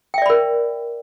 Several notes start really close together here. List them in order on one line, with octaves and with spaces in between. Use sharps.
G5 E5 D5 B5 A#4